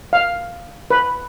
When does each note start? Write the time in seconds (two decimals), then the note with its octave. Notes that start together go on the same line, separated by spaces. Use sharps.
0.13 F5
0.91 B4